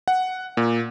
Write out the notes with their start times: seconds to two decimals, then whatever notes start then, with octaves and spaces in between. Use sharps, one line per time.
0.08 F#5
0.57 A#2